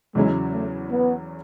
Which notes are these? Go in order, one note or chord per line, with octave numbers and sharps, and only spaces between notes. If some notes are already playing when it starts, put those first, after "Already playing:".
E2 C#3 F#3 G#3 C#4 E4
A3
B3